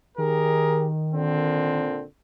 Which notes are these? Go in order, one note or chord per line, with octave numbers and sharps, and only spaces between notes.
D#3 G4 G#4 A#4
A#2 D3 C4